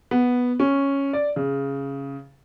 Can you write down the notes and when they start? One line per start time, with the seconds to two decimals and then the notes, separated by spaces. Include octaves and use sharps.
0.11 B3
0.60 C#4
1.13 D5
1.36 C#3